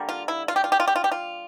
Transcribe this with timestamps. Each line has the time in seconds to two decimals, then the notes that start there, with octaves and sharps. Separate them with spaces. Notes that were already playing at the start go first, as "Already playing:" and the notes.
Already playing: D3 G3 A#3
0.09 F4
0.28 E4
0.48 F4
0.56 G4
0.64 F4
0.72 G4
0.80 F4
0.88 G4
0.96 F4
1.04 G4
1.12 F4